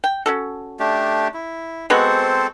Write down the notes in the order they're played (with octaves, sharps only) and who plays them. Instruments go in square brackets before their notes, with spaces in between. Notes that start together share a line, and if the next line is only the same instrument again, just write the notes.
[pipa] G5
C#4 F#4 A4
[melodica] A3 D4 G4
E4
[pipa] G#3 B3 F#4 [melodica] C4 A4 C5